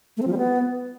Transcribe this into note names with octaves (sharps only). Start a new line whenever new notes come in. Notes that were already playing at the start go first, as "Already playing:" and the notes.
A3
C4
F3
G3
B3